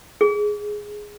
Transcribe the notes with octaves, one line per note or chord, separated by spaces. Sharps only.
G#4